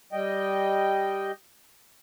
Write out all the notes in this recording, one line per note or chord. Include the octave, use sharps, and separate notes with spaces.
G3 D#5 G5